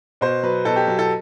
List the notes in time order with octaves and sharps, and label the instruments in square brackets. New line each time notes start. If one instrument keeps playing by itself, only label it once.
[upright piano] B2 C5
F#3 B4
B2 A4
G4
F#3
A4